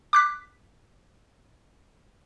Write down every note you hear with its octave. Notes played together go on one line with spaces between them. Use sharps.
D6 F#6 B6